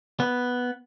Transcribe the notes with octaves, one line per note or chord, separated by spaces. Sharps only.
B3